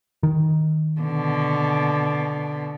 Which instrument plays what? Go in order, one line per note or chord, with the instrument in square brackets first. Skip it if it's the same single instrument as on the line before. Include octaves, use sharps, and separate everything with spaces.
[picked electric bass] D#3
[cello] B2 D3